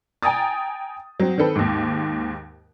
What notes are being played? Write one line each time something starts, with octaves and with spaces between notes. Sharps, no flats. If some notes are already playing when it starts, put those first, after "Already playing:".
G5 G#5 A#5 D#6 A6
F#3 C4
D#3 C4 A4 B4
D#2 G#2